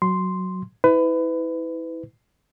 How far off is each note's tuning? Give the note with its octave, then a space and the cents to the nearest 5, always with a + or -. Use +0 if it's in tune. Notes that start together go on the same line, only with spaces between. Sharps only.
F#3 +0 C6 +0
E4 -25 B4 +25